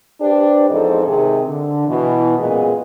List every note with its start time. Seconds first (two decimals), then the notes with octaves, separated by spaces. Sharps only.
0.21 D4 G4 B4 C5 D5
0.70 E2 G#2 F3 C4 A4 D#5
1.07 G#2 C3 D#3 G#4
1.48 D3
1.87 B2 E3
2.38 F#2 A#2 G#3 B3 G#4 D#5